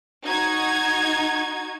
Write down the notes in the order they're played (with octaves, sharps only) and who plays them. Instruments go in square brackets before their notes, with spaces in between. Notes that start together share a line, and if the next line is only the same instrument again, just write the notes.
[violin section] D#4 F#4 G#6